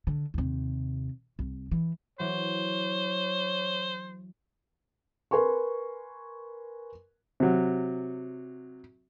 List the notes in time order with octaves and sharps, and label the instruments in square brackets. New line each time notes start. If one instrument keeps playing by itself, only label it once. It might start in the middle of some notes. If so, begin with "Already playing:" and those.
[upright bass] D3
D#2 C3
C2
E3
[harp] E3 F#3 [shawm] C5 [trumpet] C#5
[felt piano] A#4 B4 G#5 C6 C#6
[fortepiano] C3 F#3